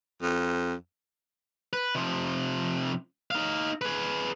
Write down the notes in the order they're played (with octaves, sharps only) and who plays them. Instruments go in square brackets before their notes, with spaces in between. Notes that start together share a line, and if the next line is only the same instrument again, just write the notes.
[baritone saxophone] F2
[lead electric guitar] B4
C3 F3
D#4 F5
G#4 B4